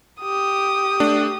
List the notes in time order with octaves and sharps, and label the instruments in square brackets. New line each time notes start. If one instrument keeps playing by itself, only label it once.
[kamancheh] G4 D#6
[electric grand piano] A3 D4